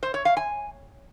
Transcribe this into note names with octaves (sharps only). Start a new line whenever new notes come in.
C5
C#5
F5
G#5